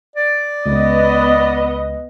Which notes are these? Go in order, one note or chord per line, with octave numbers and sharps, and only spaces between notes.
D5
C#2 B3 D#5